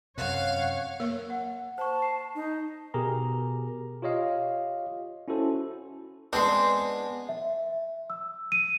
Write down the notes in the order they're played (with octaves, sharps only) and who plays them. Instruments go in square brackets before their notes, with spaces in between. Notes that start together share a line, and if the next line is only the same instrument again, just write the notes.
[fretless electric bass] F#2 C3 [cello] C#5 [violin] F5 [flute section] F#5 F#6
[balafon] A#3 A#4 C#5
[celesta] F#5
[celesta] C5 C#6 [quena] A5
[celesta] C7
[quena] D#4
[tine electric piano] B2 G4 G#4 A#4 A#5
F4 G4 C#5 D#5 F5
C#4 E4 F#4 A4 C5
[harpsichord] G#3 B3 D4 [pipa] C4 C6
[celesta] E5
E6
D#7